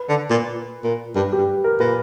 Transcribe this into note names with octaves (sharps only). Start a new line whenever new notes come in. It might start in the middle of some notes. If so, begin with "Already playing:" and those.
Already playing: B4
D3
A#2
A#2
G2 B4
G4
G2
A#4
A#2 B4